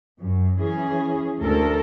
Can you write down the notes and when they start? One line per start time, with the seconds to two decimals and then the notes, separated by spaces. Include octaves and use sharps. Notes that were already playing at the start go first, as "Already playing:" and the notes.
0.19 F#2
0.59 E3 C#4 G#4
1.40 D2 A4 A#4